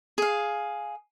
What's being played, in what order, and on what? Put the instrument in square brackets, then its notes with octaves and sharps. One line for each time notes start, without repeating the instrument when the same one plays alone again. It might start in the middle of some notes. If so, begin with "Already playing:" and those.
[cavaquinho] G#4 F5